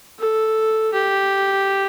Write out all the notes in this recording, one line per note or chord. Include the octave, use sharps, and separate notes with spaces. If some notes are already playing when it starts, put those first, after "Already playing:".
A4
G4